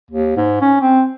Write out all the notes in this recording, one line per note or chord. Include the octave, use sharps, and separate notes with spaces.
D#2
G#2
C#4
C4